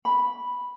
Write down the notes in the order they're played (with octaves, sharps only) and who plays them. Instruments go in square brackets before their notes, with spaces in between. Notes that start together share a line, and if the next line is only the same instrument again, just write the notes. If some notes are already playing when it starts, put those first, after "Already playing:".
[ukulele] B5